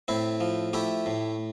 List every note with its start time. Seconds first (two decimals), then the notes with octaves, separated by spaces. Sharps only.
0.08 A2 C4 E4
0.40 F3
0.73 A3 E4 G4
1.06 A2